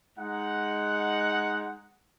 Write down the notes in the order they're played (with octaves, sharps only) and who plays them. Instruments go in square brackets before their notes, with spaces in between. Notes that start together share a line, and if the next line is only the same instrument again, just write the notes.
[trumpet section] G#3 D#4 F#5